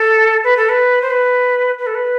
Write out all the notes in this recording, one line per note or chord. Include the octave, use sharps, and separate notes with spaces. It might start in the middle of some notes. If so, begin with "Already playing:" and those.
Already playing: A4
B4
A4
B4
C5
B4
B4
A4
B4